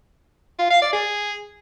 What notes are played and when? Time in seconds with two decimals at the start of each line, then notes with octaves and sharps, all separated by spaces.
0.59 F4
0.71 F5
0.82 D5
0.93 G#4